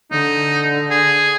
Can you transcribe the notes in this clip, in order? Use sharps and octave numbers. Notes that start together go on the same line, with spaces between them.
D3 D#4
G#4